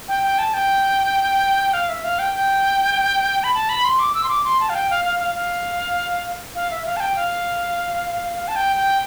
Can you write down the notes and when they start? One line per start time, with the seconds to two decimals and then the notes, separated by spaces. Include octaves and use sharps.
0.08 G5
0.23 G5
0.38 A5
0.54 G5
1.73 F5
1.89 E5
2.04 F5
2.19 G5
2.33 G5
3.44 B5
3.54 A5
3.69 B5
3.84 C6
3.99 D6
4.14 E6
4.23 C6
4.29 D6
4.44 C6
4.60 A5
4.69 F5
4.75 G5
4.90 F5
5.05 F5
5.20 F5
5.35 F5
6.55 F5
6.71 E5
6.85 F5
6.96 A5
7.00 G5
7.16 F5
8.36 F5
8.48 A5
8.56 G5
8.76 G5